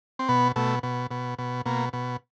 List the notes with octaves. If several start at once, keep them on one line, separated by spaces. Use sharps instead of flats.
C4
B2 B3
B2 A3
B2
B2
B2
B2 A#3
B2